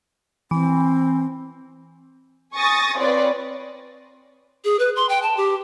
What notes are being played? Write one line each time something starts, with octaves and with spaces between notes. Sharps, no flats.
E3 C4
G#5 C#6 D#6 A6 A#6
C4 F4 B4 C#5 D5
G#4
B4
C6
G5
A5
G4